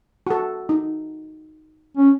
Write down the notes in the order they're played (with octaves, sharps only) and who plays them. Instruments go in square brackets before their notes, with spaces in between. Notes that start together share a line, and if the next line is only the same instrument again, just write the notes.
[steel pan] F#4 A4
D#4
[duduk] C#4